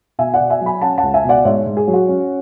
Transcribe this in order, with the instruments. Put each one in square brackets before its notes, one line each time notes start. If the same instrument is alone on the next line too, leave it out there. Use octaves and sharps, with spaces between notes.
[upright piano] B2 E5 G#5
D5 F#5
B2
E5 G#5
F#3
G#5 B5
C#4 F#5 A5
F#5 A5
C#2
E5 G#5
B2
D5 F#5
G#2 C#5 E5
G#2
G#4
F#3
F#4
C#4